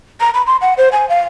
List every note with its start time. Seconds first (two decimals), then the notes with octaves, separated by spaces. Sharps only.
0.20 A#5
0.34 B5
0.47 C6
0.61 F#5
0.78 C5
0.92 G#5
1.09 F5